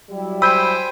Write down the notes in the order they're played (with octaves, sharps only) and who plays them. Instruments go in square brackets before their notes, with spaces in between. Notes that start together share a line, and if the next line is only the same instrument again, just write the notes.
[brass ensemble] F#3 G3 E4
[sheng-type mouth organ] C5 G5 G#5 [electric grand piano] B5 G6 [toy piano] E6